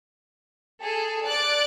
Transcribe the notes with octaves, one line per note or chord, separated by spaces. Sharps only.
G#4 A4
D5 F#6 A6 D7